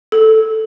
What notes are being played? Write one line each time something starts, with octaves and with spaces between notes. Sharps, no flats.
A4